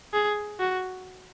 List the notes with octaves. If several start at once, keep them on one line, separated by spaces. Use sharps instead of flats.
G#4
F#4